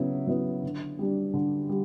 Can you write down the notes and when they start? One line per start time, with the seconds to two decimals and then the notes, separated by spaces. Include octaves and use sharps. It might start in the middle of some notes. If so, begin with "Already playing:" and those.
Already playing: C#3 F#3 B3 E4
0.27 F#3 B3 E4
0.63 D3
0.99 G3 D4
1.34 D3
1.69 G3